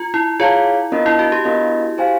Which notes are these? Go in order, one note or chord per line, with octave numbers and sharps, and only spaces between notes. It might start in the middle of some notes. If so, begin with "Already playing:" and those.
Already playing: F4
E4
F4 G#4 C#5 F5 A5
B3 D4 F4 A#4 D#5
E4
F#4
G4
B3 D4 F4 A#4 D#5
G4 C5 F5 G#5